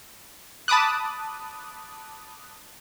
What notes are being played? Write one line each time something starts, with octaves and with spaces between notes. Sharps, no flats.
A5 B5 D6 D#6 F#6